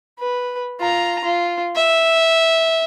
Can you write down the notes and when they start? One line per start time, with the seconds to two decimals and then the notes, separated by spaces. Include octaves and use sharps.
0.19 B4
0.80 F4 A#5
1.24 F4
1.76 E5